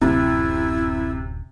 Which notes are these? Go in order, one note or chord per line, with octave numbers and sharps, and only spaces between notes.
D1 F#2 C3 E4